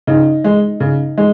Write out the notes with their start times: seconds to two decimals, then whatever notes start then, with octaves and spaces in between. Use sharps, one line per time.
0.07 C#3 D#4
0.44 G#3
0.80 C#3
1.18 G#3